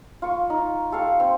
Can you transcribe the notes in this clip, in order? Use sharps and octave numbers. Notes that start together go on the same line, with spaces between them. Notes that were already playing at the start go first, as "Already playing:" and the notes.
F4 C#6
D#4
G4 A4 F5 C#6
C4